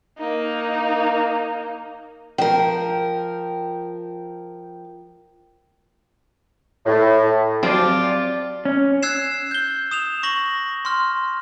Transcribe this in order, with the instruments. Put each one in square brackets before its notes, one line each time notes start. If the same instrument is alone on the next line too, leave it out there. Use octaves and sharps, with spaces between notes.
[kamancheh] A#3 D#4
[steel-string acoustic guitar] F3 A#4 [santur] G5
[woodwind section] A2
[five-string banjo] F3 [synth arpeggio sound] F#3 C4 [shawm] F4 [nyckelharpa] G4 D5
[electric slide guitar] C#4
[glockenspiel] E6 F#6 G#6 C7 E7
G6 G7
D#6 E7 F7
C#6 A#6 F#7
C6 F6